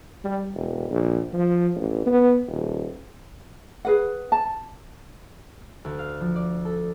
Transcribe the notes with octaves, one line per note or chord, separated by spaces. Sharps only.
G3
E1
A#1
F3
A1
B3
D#1
G#4 B4 F#5
A5
D2
F5
F3
D5
A4